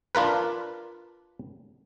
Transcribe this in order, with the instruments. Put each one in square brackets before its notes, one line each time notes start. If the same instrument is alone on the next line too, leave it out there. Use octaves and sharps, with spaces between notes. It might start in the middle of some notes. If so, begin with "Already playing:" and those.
[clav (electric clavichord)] D4 F4 A#4 B4